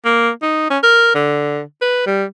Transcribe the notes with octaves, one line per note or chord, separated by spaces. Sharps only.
A#3
D#4
C#4
A#4
D3
B4
G3